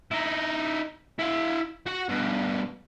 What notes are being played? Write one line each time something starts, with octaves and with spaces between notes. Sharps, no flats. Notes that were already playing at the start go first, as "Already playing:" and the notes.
D#4 E4
E4 F5
F#4 F#5
G2 B2